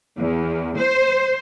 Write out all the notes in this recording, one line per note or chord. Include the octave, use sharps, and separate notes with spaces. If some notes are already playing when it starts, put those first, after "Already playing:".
E2
C5